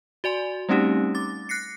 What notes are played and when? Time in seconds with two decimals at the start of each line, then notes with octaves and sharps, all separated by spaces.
0.24 F#4 D5 G#5 C6
0.69 G3 A3 C4 C#4 D#4 G4
1.15 D6 A6
1.49 F#6 A#6 C7 C#7